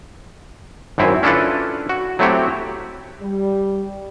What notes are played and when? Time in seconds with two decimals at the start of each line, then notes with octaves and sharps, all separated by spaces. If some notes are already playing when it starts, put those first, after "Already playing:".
0.98 G#1 F#2 C4 E4 G#5
1.23 C#4 D4 E4 F4 A4 B4
1.89 F#4
2.19 F#3 A3 C4 E4 F#4 G4
3.22 G3